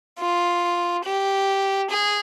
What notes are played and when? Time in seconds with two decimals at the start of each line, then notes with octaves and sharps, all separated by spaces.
0.19 F4
1.04 G4
1.90 G#4